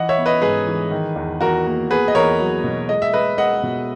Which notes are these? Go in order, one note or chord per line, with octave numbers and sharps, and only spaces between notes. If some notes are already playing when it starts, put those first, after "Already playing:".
Already playing: E3 D#5 F#5
C#5 E5
B3
B4 D#5
G#2 G#4 B4
E3
D#3
E2
E2 F#4 A#4
A#3
B3 G#4 B4
D#5
E2 A#4 C#5
F#3
B2
G#3 D#5
E5
G#3 B4 D#5
G#3 D#5 F#5
B2